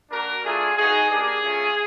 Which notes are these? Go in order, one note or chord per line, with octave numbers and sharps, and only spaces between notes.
A#3 D4 F#4 A#4
A3 D4 F4 G#4
B3 D#4 F#4 G#4
A#3 D4 G4 G#4
A3 C#4 F4